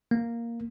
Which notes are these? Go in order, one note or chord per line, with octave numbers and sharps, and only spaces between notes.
A#3